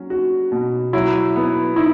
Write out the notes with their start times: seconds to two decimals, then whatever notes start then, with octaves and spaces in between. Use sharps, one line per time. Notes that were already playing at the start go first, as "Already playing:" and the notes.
Already playing: F#3 C#4
0.10 F#4
0.52 B2
0.93 F#3 E4
1.36 B3
1.76 D#4 E4